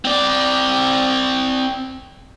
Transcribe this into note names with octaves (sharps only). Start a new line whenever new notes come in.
C4 D5